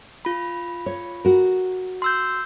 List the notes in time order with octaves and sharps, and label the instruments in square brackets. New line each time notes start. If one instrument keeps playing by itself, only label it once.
[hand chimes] F4 B5
[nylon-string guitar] C#5
F#4 A#4
[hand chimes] C6 E6 G6